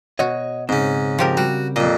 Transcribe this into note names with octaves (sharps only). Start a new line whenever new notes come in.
B2 F#4 C#5 D#5
G#2 C#3 C4 C#4
F3 G4 A#4
G3 F#4
F2 A#2 D#5